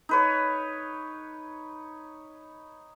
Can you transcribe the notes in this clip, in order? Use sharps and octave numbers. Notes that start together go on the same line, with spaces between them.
D#4 B4 C#5